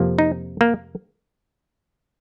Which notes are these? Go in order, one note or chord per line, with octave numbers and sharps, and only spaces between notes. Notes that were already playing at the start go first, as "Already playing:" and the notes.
Already playing: F2 C3 F3 A#3
D#4
A#3